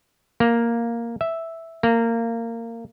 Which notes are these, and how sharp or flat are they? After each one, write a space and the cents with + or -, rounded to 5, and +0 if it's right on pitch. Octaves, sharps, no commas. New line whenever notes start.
A#3 +0
E5 -5
A#3 -20